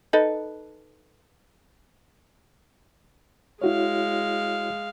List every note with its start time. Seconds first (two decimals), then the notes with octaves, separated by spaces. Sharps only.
0.13 D#4 A4 B4
3.61 G#3 E4 F#4 C#5 F5